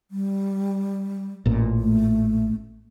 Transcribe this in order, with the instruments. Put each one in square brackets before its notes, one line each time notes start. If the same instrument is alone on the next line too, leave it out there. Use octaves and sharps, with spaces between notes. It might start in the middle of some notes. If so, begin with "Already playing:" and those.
[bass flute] G3
[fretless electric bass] A1 A#2
[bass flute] A3